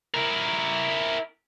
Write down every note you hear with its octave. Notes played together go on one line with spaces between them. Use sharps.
E4 A#4